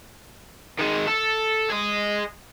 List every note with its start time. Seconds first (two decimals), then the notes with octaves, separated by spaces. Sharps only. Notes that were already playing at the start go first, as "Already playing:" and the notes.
0.79 D#3 G#3
1.07 A4
1.70 G#4 D#5